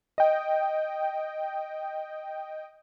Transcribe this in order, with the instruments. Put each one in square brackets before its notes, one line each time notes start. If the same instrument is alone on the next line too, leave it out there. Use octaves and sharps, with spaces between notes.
[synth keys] D#5 G5